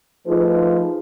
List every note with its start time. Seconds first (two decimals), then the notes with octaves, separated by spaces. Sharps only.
0.27 F3 A3 D#4 F4 G#4 B4